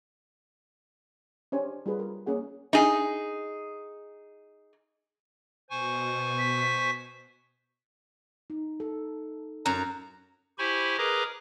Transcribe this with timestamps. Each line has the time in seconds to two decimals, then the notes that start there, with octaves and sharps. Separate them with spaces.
1.52 C#4 D4 G4 C5 C#5 G#5
1.86 G3 F4 G#4 B4
1.99 A#4
2.26 A#3 C#4 G#4 F#5
2.73 D#4 G#4
5.70 B2 C5 G#5 C#6
6.39 B6
8.50 D#4
8.80 A4
9.66 F#2 A#5
10.58 E4 G4 C5 G#5 B5 C#6
10.98 G#4 A#4 B4 D#5 A#5 D6